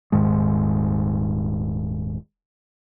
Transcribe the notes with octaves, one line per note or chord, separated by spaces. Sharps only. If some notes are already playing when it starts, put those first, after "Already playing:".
D#1 G#2 D#3 G#3